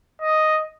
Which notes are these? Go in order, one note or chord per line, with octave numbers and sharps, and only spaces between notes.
D#5